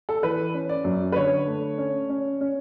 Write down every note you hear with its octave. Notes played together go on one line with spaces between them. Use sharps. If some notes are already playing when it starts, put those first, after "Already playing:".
A4
E3 B4
C#4
D5
F#2
B4
D3 C#5
A3
C#4
C#4
C#4